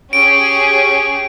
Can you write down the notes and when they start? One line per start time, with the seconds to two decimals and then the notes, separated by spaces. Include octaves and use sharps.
0.13 C#4 G4 G#4 D7